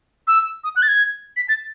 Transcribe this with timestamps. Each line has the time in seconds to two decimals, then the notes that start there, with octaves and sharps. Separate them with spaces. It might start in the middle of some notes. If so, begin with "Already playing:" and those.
0.27 E6
0.64 D#6
0.76 F#6
0.82 A6
0.88 G#6
1.36 B6
1.49 A6